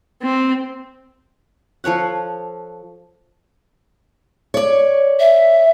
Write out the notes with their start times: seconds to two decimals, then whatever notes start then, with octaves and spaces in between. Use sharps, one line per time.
0.22 C4
1.84 F3 A4 C#5 F#5
4.54 C#5 D5
5.20 E5